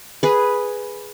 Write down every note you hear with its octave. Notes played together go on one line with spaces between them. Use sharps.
G#4 B4